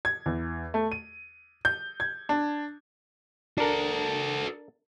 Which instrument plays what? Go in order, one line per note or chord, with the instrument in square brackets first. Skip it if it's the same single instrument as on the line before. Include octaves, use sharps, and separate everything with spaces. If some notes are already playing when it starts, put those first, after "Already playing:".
[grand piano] G#6
E2
A3
D#7
G6
G#6
D4
[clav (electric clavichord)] D4 A#4 [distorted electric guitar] F#4 A4